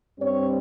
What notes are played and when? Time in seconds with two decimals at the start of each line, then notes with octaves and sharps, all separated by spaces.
0.20 G2 G3 C4 C#5